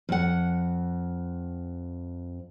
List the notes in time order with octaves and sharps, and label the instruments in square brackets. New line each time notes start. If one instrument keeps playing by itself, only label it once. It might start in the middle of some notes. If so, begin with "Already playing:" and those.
[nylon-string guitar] F2 F#5